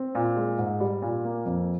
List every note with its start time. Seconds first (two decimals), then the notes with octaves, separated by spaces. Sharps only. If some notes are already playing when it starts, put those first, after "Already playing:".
Already playing: C4
0.15 A#2
0.37 G#3
0.59 G#2
0.80 G3
1.02 A#2
1.24 A#3
1.45 F2